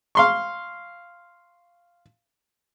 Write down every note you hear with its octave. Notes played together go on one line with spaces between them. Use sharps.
F5 C6 C#6